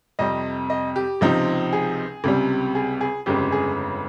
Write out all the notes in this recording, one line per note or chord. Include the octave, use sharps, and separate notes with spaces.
F2 C3 G3 D#5
D#5
G4
C#2 C3 F3 C4 D#4
G#4
C#2 C3 G3
G#4
G#4
G1 F2 C#3 G#3 G4
G#4